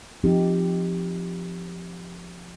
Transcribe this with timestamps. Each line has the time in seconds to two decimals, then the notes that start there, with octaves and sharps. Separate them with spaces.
0.24 F3 C4 D#4 G4